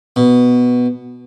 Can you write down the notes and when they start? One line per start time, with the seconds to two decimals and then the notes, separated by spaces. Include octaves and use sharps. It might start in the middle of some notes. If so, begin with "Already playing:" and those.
0.16 B2